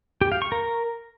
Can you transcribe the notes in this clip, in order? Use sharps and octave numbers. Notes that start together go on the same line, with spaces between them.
G4
F5
C#6
A#4